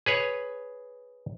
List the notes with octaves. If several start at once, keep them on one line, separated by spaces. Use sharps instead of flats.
G#4 B4 C#5